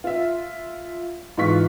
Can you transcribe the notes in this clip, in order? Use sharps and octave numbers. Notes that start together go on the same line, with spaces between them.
F4 E5
G#2 E3 F4 C#6 B6